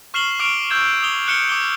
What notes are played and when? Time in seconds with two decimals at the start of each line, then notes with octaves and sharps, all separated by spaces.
0.14 C#6 F6 C7 E7 F#7 G7
0.39 C#6 D6 F6 D7 F7
0.70 C#6 E6 G6 G#6 E7
1.03 D#6 F7 G7
1.27 F6 F#6 C#7 E7 G7
1.49 D6 G7